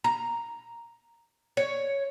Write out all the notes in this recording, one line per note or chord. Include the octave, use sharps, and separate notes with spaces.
A#5
C#5